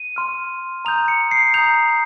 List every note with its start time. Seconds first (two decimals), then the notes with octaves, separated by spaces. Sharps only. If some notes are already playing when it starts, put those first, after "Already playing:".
Already playing: D#7
0.16 C6 F6
0.85 A#5 D#6 G6 F7
1.08 C#7
1.31 C7
1.54 A#5 D#6 G6 F7